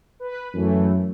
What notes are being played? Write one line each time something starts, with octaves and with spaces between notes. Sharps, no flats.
B4
F#2 E3 A3